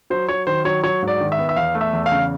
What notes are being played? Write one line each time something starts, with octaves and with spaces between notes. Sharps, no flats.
F#3 C5
F#3 C#5
D#3 C5
F#3 C#5
F#3 C#5
G#2
D5
D#3
E5
B3
E5
E2 F5
A3
E5
E2
F5
C#3